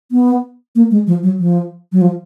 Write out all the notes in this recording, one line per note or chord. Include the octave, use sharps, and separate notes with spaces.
B3
A#3
G#3
F3
F#3
F3
F#3
F3